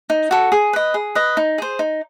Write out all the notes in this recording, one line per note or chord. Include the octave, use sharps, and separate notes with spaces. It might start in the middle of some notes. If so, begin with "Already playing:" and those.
D#4
F#4 A4
G#4
B4 D#5
G#4
B4 D#5
D#4
G#4 C5
D#4